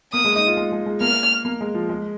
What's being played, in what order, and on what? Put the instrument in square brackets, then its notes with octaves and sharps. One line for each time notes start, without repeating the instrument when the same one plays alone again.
[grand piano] A#3 [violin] D#6
[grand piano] G#3
D#4
F4
G#3
G#3
G#3
[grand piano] A#3 [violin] F6
[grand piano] A#3
G#3
F3
G#3